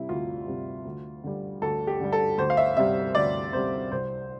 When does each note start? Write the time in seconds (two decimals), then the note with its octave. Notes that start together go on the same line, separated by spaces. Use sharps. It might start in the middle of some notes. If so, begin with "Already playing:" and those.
Already playing: C3 G3 E4
0.09 D2 F4
0.47 C3 G3
0.85 D2
1.23 D3 G3
1.62 D2 A4
1.87 G4
2.00 D3 G3
2.12 A4
2.38 D2 C5
2.50 F5
2.57 E5
2.76 C3 G3 E5
3.15 D2 D5
3.53 C3 G3 C5
3.91 C2 C5